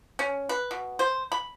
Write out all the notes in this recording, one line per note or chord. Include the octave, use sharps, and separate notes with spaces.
C#4
B4
B2
C5
B5